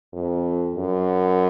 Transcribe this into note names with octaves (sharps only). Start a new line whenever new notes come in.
F2
F#2